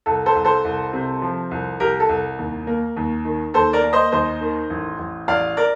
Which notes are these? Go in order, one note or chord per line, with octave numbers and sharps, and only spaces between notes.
C2 A4
A4 C5
C2
A4 C5
C2
C3
F3
C2
C2 G4 A#4
A4
C2
D#2
A#3
D#2
D#3
D#2 A4 C5
A#4 D5
A#3
C5 D#5
D#2 C5 D#5
D#3
A1
A1
A1 D5 F5
A#4 D5